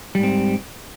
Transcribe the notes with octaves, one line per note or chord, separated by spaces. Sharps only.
G#2 G3 C4